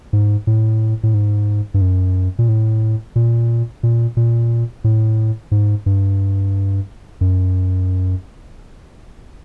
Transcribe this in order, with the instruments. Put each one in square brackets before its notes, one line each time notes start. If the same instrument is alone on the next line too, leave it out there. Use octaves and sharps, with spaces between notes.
[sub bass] G#2
A2
A2
G#2
G2
F#2
A#2
A2
A#2
A#2
A#2
A2
G#2
G2
F#2